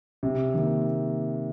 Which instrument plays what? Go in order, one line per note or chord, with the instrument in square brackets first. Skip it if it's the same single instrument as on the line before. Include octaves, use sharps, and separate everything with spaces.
[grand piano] C3
D#3 A#3